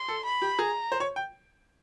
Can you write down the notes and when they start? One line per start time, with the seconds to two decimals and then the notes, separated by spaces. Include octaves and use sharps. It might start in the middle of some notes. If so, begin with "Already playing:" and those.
Already playing: C6
0.08 A4
0.25 B5
0.42 G4
0.58 G#4 A#5
0.92 C5
1.00 C#5
1.16 G5